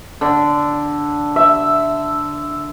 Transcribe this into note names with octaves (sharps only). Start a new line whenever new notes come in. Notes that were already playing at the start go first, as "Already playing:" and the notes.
D3
E5